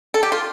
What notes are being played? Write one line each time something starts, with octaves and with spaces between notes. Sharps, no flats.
A4
G4
F4